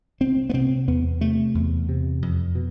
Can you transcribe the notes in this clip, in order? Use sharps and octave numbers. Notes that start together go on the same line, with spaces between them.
C2 C4
B3
C3 C4
E2 B3
C3 A3
E2
C3
F2
B2